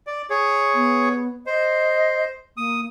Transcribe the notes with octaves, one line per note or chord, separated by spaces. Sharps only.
D5
G#4 C#5
B3
C5 D#5
A#3 D#6